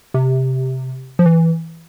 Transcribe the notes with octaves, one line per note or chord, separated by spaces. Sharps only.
C3
F3
E3